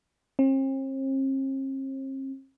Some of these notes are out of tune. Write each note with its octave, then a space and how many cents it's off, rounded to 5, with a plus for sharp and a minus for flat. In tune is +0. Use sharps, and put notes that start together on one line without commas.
C4 +45